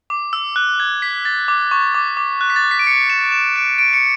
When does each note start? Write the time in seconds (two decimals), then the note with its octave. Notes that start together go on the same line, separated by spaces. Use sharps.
0.10 D6
0.33 E6
0.56 F#6
0.80 G#6
1.02 B6
1.25 A6
1.48 D6
1.71 C#6
1.95 D6
2.17 D6
2.41 F#6
2.50 B6
2.56 A6
2.71 B6
2.79 D7
2.87 C#7
3.10 E7
3.32 E7
3.56 D7
3.79 D7
3.93 C#7